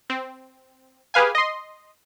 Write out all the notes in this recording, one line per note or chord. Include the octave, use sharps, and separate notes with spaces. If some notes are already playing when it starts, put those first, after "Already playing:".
C4
G4 G#4 B4 F5 G#5
D#5 C6